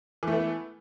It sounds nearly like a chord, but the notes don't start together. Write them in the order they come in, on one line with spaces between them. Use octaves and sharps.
E3 A3 B3